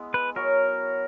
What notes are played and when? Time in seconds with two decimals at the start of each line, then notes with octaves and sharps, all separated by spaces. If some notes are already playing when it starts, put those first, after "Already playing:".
Already playing: G#3 B3 E4
0.14 B4
0.35 F#3 B3 F#4 A#4 C#5